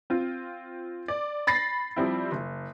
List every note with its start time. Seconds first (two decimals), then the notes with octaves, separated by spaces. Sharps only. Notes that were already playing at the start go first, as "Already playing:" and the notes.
0.10 C4 F4
1.08 D5
1.47 B5 A6 A#6 C7
1.96 F3 G3 C4 E4
2.32 F#1